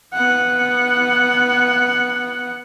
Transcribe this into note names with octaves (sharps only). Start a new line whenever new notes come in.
B3 F#5